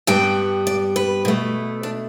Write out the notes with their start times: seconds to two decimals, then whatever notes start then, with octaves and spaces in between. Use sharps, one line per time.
0.07 G2 G3 B3 G5
0.67 D5
0.96 B4
1.25 B2 A3
1.83 D4